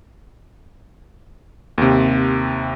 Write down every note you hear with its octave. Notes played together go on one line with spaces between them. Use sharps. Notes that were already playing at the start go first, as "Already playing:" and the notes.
D#2 C3